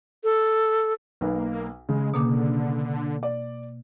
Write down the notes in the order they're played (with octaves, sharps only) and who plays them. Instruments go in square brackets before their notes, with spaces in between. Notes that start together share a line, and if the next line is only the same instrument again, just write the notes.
[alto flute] A4
[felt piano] B1 B4 [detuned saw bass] A#3
[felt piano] C#3 [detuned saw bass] G#3
[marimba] B2 A#3 D6 [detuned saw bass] D3
[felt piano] D5